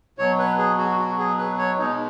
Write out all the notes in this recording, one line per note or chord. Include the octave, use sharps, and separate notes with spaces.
B2 F#3 C#5
B4
G#4
F#4
F#4
G#4
B4
C#5
B2 G#3 D#4